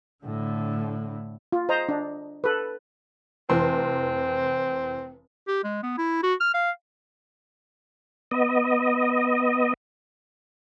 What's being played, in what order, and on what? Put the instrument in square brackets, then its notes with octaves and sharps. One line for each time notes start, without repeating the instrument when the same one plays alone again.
[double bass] A2 D3
[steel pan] F4
C5 D#5 A#5
D4
A4 B4
[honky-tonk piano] F1 E3 C6 [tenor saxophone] C4
[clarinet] G4
G#3
B3
E4
F#4
F6
F5
[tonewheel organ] B3 D#5